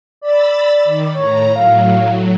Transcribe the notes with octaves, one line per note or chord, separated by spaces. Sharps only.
D5 B5 E6 A6
D#3
A2 C#5 A#5
A2 F#3 F5